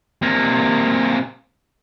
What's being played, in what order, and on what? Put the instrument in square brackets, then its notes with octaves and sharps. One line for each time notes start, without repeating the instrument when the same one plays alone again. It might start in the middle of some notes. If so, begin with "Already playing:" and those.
[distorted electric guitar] C3 A#3